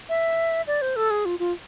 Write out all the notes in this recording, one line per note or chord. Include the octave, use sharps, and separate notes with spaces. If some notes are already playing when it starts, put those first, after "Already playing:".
E5
D5
C5
A4
G#4
F4
F4